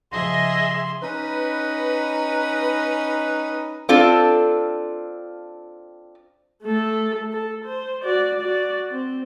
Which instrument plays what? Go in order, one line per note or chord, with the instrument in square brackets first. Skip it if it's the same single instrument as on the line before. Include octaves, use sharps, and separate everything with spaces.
[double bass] C#3 F3 [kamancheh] G#4 E5 [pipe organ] D#5 [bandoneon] C6
[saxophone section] C#4 D#4 B4
[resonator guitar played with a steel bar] C4 D4 F4 A4
[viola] A3 A4
A4
C5
F#4 D5
F#4 D5
C4